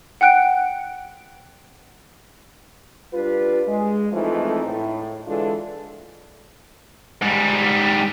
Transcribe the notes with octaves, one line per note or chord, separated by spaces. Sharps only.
F#5 G5 F#6 D7
G3 D4 F4 B4
G#3
F2 E3 F3 G#3 A3 D#4
A2
D3 E3 G#3 D4 F4 A4
G#2 G3